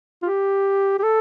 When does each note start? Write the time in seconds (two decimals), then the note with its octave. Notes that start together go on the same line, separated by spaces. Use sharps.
0.22 F4
0.26 G4
0.99 G4
1.03 A4